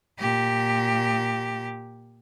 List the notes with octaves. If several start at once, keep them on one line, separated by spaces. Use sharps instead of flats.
A#2 G4